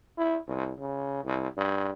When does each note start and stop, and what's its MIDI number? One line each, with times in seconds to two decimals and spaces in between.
0.18 0.38 64
0.48 0.71 36
0.80 1.22 49
1.23 1.47 36
1.57 1.91 43